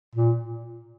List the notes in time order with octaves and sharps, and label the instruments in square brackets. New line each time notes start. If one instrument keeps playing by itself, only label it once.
[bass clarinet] A#2